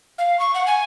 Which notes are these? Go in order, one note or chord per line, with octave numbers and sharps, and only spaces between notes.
F5
C#6
F#5
G#5